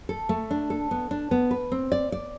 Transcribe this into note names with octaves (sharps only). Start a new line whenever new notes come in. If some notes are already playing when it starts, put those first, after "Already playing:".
A4
A3
D4
A4
B3
D4
B3
B4
C4
D5
D5